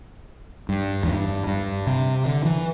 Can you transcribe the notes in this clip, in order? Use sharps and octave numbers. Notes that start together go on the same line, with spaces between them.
G2
E2
G2
G2
C3
D3
E3